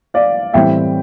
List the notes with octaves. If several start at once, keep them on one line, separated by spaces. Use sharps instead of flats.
D5 F5
A2 E3 G3 C4 E5 G5